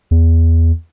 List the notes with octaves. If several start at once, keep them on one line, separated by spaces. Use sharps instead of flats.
E2